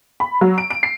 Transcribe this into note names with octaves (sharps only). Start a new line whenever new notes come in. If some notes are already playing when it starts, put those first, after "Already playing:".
B5
F#3
D7
D7
C7